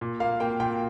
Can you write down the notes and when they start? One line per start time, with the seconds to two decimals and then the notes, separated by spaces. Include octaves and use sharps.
0.01 A#2
0.20 A#3 F5
0.40 A#3 G5
0.60 A#2 G5